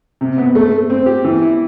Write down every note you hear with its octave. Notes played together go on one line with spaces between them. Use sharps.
C3
B3
A3
A3
C4
G4
E3
E4